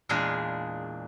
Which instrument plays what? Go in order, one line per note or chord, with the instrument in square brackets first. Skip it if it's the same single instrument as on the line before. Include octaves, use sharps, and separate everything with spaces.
[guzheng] E2 A#2 G#3 D4 G#4 F5